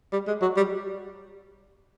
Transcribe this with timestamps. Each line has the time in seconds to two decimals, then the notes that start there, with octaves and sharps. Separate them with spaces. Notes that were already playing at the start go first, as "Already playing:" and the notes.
0.13 G3
0.27 G#3
0.42 F#3
0.57 G3